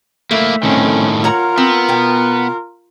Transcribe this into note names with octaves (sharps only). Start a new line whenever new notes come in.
A3 A#3 E4
A2 D#3 C4 C#4
F4 A#4 C#5 F#5 A#5
B3 C4
B2 G5